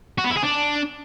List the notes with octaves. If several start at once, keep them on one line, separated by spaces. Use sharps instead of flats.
F#4
B3
E4
G#4
D4